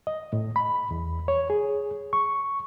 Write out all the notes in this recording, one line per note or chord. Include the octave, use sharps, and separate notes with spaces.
D#5
A2
B5
E2
C#5
G#4
C#6